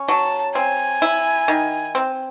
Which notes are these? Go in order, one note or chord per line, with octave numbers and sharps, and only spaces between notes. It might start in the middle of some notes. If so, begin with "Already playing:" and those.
Already playing: C#4
F#3 A5
C4 G#5
E4
D#3
C4